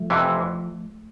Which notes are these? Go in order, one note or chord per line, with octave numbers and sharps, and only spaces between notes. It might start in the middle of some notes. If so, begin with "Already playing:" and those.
Already playing: F3 A3
F2 C3 E3